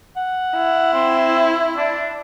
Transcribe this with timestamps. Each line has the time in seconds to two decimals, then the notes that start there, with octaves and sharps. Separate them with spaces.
0.16 F#5
0.56 E4
0.93 C4
1.77 D4